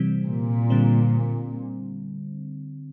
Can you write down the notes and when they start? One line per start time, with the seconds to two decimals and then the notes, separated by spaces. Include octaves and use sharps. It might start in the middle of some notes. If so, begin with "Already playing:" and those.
Already playing: C3 E3 G3 C4
0.25 A#2
0.70 D3 G3 C4